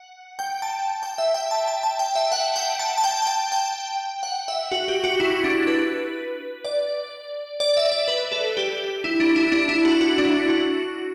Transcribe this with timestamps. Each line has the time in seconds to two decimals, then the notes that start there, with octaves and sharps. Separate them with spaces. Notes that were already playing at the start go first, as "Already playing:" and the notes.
Already playing: F#5
0.39 G5
0.62 A5
1.03 G5
1.18 E5
1.34 G5
1.51 A5
1.68 A5
1.83 A5
1.99 G5
2.15 E5
2.32 F#5
2.56 G5
2.79 A5
2.98 A5
3.04 G5
3.22 A5
3.27 G5
3.52 G5
4.23 F#5
4.48 E5
4.72 F#4
4.88 G4
5.04 F#4
5.20 E4
5.44 D4
5.67 B4
6.65 D5
7.60 D5
7.77 E5
7.92 D5
8.08 B4
8.32 A4
8.57 G4
9.04 E4
9.20 D4
9.36 E4
9.52 D4
9.69 E4
9.85 F#4
10.01 F#4
10.18 D4
10.25 E4
10.49 F#4